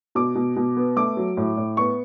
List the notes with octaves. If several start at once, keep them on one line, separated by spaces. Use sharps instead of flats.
B2 D6
B2
B2
B3
A3 D6
F#3
A2
A2
B3 C#6